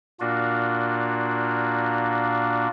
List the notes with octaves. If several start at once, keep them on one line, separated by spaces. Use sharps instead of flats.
A#2 A#3 D4 F4 F#4